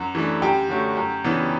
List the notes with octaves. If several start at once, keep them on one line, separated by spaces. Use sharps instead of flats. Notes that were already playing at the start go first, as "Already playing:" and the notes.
Already playing: F#2
E3 A3 D4
F#2 G4 G5
D3 F#3 A3
F#2
C#3 E3 B3 D4